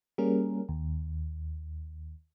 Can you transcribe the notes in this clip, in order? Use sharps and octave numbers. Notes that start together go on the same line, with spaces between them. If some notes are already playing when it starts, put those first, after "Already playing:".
G3 A#3 C#4 G#4 A#4
D#2